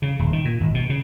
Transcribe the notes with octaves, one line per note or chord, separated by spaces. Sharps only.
C#3
D#1
D#3
A#2
G#1
B2
C#3